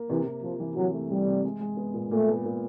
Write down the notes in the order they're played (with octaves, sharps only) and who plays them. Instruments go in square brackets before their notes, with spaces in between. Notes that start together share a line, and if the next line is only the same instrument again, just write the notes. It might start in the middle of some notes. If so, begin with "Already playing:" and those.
Already playing: [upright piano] A#3
[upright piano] C3 [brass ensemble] E3
[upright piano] C3
[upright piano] C3 [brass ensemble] F3
[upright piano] E3
[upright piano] C3 [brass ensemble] F#3
[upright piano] A3
[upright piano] C3 [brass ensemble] G3
[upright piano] C3
G#3
G#3
B3
A#2
[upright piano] A#2 [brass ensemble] A3
[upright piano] B3
A#2